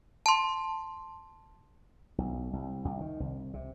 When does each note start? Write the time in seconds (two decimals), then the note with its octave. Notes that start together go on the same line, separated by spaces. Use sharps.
0.26 A5 C6
2.18 B1
2.53 C2
2.85 C2
3.01 D#3
3.20 C2
3.54 C3